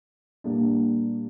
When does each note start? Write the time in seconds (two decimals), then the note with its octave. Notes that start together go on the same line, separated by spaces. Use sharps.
0.44 A#2 G3 A#3 D4 G4